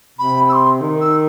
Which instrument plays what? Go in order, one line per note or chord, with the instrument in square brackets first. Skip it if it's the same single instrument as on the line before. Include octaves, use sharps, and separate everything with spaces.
[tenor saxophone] C3 [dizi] B5
[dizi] E6
C6
[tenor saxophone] D#3
[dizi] E6